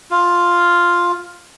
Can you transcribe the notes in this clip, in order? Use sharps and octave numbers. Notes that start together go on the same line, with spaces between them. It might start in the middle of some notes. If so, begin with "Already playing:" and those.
F4